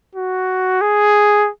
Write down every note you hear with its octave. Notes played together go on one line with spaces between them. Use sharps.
F#4
G#4